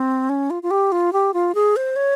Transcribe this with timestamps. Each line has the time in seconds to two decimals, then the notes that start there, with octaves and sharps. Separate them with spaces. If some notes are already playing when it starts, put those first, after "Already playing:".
Already playing: C4
0.29 C#4
0.50 F4
0.63 F4
0.71 G4
0.92 F4
1.13 G4
1.34 F4
1.55 G#4
1.76 C5
1.96 C#5